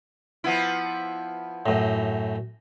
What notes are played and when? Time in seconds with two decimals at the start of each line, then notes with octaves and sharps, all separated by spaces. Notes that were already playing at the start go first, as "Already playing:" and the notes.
0.44 F3 B3 E4
1.66 F#2 A2